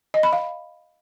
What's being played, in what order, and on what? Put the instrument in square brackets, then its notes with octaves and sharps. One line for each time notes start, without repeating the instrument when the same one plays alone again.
[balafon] D#5
B5
F5